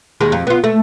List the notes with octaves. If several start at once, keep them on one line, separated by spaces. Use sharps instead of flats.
D#2 D#3 G#3
F2
B3 F4
A3